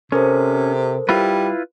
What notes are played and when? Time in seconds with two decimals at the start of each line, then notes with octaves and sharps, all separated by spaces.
0.12 C3 C#4 A4 A#4 C5
1.09 G3 E4 F4 B4